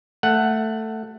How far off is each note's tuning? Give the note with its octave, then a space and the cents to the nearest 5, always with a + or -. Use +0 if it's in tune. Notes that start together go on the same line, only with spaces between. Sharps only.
A3 +10 F#5 +0